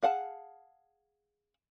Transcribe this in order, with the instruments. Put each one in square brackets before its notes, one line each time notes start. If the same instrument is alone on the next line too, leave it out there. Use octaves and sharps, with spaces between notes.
[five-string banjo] G#4 F5 F#5 A5